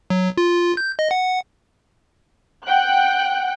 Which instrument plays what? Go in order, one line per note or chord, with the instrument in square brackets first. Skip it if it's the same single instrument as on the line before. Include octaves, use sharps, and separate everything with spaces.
[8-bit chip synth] F#3
F4
G6
D#5
F#5
[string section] F#5 G5 F#6